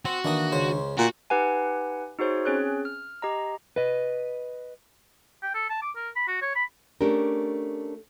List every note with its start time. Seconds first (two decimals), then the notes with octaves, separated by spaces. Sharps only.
0.05 C4 F#4
0.24 D#3 E3 A#3 D4 D#6
0.52 C#2 C#3 C5
0.98 A#2 F#4
1.30 D#4 G4 B4 F#5 G#5
2.19 D#4 F#4 G#4 C5 C#5
2.45 C4 C#4 G#4 C#5 F#6
2.85 F6
3.22 G4 D#5 A#5
3.76 B4 D#5
5.43 G5
5.54 A4
5.70 A5
5.82 D6
5.96 A#4
6.16 B5
6.28 F#4
6.42 C#5
6.56 B5
7.01 A3 C#4 D4 G4 A#4